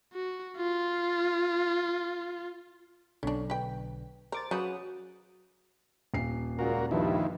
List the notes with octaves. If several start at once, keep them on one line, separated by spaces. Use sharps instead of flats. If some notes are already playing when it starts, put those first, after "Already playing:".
F#4
F4
B1 D3 C#4 D4
B4 G5
A#4 C5 D6 A6
C#3 F#3 B4 F#5 D#6
D#1 C7
C#2 A#2 F#4 A#4
G2 D#3 F3 E4